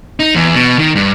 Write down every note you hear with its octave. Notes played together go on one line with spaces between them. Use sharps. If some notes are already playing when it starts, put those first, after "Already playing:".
D#4
E2
B2
D#3
G2